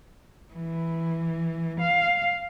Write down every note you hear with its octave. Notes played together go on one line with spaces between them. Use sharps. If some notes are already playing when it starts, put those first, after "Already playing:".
E3
F5